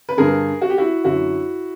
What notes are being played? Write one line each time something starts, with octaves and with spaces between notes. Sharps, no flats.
B4
G2 D3 G#4 A#4
F#4
G4
E4 F#4
F#2 D3 E4 F#4